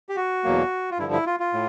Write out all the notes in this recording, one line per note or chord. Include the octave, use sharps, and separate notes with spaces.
G4
F#4
E2 B2 F#3 A#3
F4
G2 D3 F3 E4
E4
F4
F4
A2